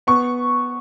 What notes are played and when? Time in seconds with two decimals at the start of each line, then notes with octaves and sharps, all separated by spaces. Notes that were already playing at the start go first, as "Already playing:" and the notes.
0.07 B3 C#6